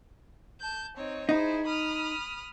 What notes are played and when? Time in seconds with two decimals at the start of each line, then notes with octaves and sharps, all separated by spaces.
0.60 A5 G6
0.95 C4 D#4 C#5
1.29 D#4 E4 G#4 C5
1.65 B5 D#6 F6